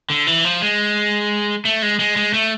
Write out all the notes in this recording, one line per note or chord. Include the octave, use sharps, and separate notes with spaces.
D3
E3
F3
G#3
A3
G#3
G#3
G#3
A3